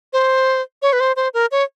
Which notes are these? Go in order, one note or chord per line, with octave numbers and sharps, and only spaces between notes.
C5
C#5
B4
C5
C5
A#4
C#5